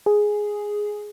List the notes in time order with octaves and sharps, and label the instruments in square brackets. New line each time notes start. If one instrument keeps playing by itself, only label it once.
[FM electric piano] G#4